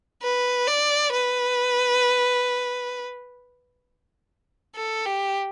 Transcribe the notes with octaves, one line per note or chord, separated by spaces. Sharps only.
B4
D5
B4
A4
G4